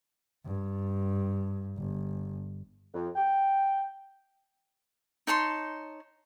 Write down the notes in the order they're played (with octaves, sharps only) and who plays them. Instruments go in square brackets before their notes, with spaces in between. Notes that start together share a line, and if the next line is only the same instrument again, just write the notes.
[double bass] G2
G1
[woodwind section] F2
G5
[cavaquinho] D#4 C#5 A5 C6